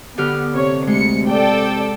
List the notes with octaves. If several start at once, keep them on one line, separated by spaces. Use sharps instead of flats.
D3 B3 G4 F6
C3 C#5
D2 G#3 C#7
A4 D5 G5